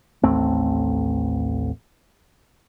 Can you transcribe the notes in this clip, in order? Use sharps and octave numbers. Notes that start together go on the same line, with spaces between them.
A1 D#2 A3 C4